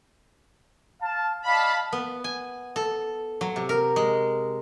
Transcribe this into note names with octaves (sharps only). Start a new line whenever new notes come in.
F5 A5
D5 D#5 F5 A5 B5
B3
G#5
A4
F#3
C3
A#4
G#3